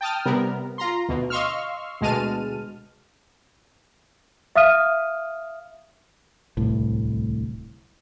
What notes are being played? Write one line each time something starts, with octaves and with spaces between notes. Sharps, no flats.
G5 A5 D#6 F6
C3 G3 B3 A#4
F4 A#5 C6
D2 B2
D#5 F5 C6 C#6 E6 F6
D2 B2 G#3 A5 F6 D#7
E5 F5 D#6 F6 D#7
D1 C2 A2